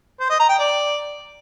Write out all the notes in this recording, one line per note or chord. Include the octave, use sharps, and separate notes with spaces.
C5
D#5
A#5
G5
D5